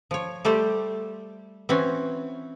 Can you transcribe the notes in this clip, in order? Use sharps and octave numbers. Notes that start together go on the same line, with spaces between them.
F3 C#5
G3 A3 G4 C5
E3 C4 C#4 F#4